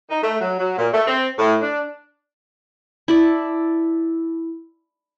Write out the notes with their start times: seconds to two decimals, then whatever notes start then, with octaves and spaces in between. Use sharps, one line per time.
0.10 D#4
0.23 A3
0.41 F#3
0.59 F#3
0.78 A#2
0.93 A3
1.07 C4
1.39 A2
1.61 D4
3.08 E4 A4 D5